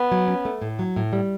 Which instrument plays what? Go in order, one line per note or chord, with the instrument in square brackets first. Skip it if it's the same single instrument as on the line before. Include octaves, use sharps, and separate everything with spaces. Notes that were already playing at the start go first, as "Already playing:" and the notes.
Already playing: [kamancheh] B3
[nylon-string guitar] F#3
C#4
A3
A2
F#3
A2
G3